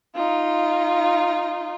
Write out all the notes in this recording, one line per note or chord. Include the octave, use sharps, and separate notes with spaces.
D#4 F4